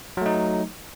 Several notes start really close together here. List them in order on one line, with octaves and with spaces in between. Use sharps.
F#3 A3 D#4